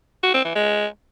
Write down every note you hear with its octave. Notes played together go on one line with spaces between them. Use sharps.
F#4
C4
E3
G#3